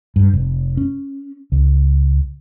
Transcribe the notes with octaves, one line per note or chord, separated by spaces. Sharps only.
G2
F1
C#4
C#2